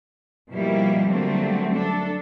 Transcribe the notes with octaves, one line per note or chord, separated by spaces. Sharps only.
B2 F3 G3 A#3 E4
D3 F#3 G3 A3 A#3 C4
D4 A4